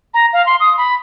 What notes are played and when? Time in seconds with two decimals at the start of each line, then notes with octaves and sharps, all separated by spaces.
0.14 A#5
0.33 F5
0.46 C6
0.60 D#6
0.78 B5